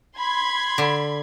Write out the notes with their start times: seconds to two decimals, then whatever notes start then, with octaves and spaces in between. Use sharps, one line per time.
0.17 B5 C6 G#6
0.78 D3